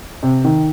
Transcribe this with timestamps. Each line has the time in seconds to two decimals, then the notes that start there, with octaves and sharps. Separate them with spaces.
0.23 C3
0.44 D#3